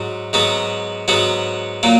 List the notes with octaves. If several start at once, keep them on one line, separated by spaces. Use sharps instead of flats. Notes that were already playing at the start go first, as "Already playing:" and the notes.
Already playing: G#2 F#3 F#4
G#2 F#3 B3 F#4
G#2 F#3 B3 F#4
A#2 F#3 A#3